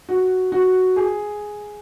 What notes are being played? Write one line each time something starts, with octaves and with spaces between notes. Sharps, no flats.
F#4
F#4
G#4